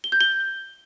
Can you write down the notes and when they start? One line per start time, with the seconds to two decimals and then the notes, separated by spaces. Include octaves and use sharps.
0.04 G7
0.12 G6
0.21 G7